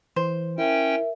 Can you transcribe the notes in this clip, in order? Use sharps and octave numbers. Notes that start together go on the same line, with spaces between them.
E3 C5
C#4 E4 A#4 E5 G5